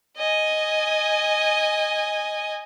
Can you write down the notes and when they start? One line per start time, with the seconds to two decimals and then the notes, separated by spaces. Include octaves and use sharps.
0.17 D#5 G#5